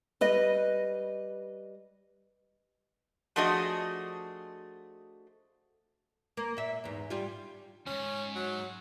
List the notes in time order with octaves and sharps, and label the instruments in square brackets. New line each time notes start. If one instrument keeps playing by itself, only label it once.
[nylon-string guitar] G3 B4 D#5
[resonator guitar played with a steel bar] F3 A3 D4 F#4 G#4 D#5
[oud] A#3
A#2 E5
E2 G#2
G3 F4
[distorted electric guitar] F2 G#2 [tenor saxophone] C#4
[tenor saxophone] F#3